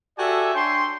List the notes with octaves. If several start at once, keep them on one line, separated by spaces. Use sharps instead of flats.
F#4 G4 A4 D5 E5 G#5
D4 C#5 G5 G#5 C6